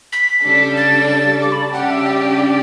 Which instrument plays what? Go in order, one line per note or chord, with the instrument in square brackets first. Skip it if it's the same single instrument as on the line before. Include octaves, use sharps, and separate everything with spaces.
[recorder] B6
[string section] C#3 G3 D4 A4
[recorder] A6
D6
B5
A5
[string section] C#3 G3 D4 G4 [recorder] F#5
[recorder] E5
D5